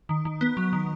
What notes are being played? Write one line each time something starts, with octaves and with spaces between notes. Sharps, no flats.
D#3
D#3
B3
F#3
D#3